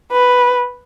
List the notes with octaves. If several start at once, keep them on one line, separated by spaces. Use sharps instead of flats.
B4